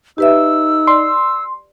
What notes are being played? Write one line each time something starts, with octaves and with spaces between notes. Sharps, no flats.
D#4 G4 B4 E5 E6
D5 C6